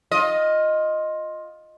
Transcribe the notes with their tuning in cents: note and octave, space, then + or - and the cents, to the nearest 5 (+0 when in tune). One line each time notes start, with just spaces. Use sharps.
F4 +15 D#5 +0